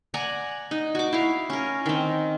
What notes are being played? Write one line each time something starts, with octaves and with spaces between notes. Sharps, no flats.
D5 F#5 G#5 A#5
D#4
F#4 D6
E4 F5
C#4 A#4
D#3 C4